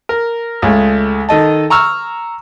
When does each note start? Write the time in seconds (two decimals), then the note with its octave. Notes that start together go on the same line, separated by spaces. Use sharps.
0.09 A#4
0.62 C#2 G#3 A3
1.29 D#3 A4 D#5 A5
1.70 A#5 C#6 E6 F6